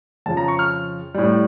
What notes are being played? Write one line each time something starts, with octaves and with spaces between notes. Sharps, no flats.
F2 C#3 F3 A5
A#5
C#6
F6
A2 G3